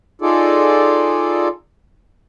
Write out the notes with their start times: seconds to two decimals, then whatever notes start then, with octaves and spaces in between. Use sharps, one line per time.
0.21 D#4 F4 G#4 A4 D5